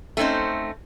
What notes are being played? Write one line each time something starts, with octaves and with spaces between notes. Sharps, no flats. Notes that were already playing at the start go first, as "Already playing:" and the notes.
A3 C4 C#4 D#4 C5